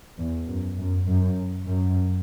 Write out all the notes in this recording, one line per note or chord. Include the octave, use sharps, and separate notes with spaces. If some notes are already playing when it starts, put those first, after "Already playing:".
E2
F#2
F#2
F#2
F#2